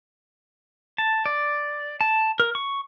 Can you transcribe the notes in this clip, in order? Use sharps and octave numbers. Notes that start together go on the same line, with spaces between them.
A5
D5
A5
A#4
C#6